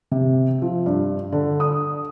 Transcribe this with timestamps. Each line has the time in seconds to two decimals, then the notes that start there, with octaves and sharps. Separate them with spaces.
0.11 C3
0.62 F3
0.86 G2
1.32 D3
1.60 D#6